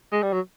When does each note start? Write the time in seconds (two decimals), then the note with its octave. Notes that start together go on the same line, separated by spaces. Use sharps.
0.12 G#3
0.23 G3
0.33 F#3